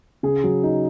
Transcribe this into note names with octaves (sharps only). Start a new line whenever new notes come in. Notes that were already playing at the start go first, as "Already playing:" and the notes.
C#3 G#4
F#3
D#4